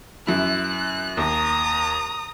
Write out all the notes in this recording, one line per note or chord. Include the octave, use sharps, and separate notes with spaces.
F#2 E4 F#6
D#2 A#5 D#6